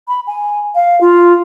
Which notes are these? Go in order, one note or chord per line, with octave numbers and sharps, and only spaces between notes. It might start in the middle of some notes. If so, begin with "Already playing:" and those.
B5
G#5
F5
F4